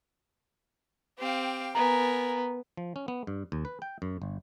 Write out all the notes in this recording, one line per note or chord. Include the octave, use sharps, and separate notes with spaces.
C4 G4 F5 G5
B3 A#4 G#5 A#5
F3
C#4
B3
G2
D#2
B4
G5
F#2
G1